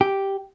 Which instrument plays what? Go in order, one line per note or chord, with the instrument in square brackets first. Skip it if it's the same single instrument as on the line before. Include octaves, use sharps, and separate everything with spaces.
[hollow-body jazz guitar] G4